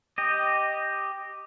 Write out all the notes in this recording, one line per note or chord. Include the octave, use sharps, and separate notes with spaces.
G4 D#5